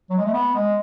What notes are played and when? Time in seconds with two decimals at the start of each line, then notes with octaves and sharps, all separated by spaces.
0.10 F#3
0.18 G#3
0.25 A3
0.33 B3
0.55 G#3